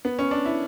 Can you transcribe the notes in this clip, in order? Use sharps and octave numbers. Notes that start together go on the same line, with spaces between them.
B3
C#4
D4
E4